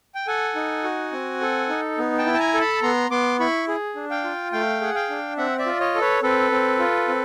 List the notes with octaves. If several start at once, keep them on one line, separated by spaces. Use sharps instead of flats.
G5
A4 F#5 G#5
D#4
F#4
C4
A4
D#4
B3
G5 A5
E4
A5
G#5 A#5
A4
A5 B5
B3 A#5 C6
B3 C6 D6
E4 B5 C#6
G#4
D4
F5 G5
F4
A3 F5 G5
G#4 F#5
F5 G5
D4
C4 E5 F#5
D5 E5
F4
C#5 D#5
A4
B4 C#5
C4 A4 B4
C4
F4
C4